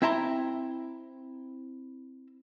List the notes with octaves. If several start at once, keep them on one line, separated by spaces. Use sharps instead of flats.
C4 E4 E5 A5 A#5 C6